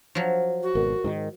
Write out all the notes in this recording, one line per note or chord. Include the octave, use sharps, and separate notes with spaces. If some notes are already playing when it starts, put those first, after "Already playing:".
F3 F#3
F#4
G#1 B2 A#4
G#2 D3 D#3